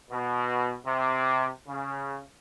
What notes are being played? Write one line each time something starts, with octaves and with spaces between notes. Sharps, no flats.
B2
C3
C#3